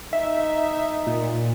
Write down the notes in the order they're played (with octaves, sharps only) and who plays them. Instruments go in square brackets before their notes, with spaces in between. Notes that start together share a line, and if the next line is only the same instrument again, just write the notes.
[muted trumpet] D#4 [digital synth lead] E5
[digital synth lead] A#2